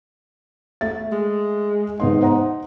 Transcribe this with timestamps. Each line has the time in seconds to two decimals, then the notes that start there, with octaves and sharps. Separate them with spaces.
0.81 A3 E5 A6
1.12 G#3
2.00 G#2 B3 D#4 C6
2.22 C5 F#5 A#5